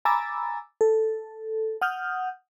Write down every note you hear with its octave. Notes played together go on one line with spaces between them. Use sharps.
G#5 A#5 B5 D6 E6 A6
A4
F#5 D#6 F6 G6